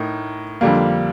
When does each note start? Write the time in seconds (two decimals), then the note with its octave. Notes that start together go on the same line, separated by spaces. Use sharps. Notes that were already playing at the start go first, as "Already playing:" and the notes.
Already playing: A2 D#4 A#4
0.61 F2 D3 G3 A#3